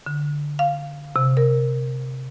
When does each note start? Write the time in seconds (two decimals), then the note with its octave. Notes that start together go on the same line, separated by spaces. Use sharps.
0.06 D3
0.59 F5
1.16 C3
1.37 A#4